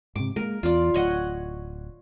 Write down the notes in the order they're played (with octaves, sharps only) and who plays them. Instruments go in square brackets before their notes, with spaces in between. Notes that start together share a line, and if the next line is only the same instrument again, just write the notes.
[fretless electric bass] G#2 C3 [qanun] D6
[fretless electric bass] G#3 A#3 [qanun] A#4
[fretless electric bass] E2 [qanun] F4 D5
[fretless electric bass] D1 [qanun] C#5 D#5 F#5